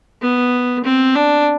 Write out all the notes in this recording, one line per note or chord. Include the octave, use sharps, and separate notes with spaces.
B3
C4
D4